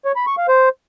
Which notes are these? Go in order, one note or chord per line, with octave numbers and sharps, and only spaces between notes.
C#5
B5
C#6
F5
C5